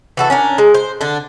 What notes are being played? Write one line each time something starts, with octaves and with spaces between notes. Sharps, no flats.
E3 F#4 A4
C#4 D4 A#4
G#3
C5
D3 D4